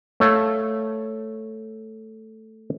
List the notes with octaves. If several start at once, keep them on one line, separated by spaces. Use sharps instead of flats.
A3 C#5 F5